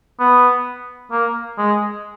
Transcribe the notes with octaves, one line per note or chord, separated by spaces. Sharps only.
B3
A#3
G#3